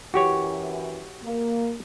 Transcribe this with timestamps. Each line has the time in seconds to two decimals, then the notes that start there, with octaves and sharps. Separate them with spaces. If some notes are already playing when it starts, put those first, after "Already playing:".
0.14 F#2 E3 F#4 G4 C#5
1.24 A#3